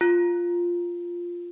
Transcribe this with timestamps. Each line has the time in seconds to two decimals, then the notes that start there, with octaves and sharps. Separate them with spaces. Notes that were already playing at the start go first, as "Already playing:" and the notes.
0.01 F4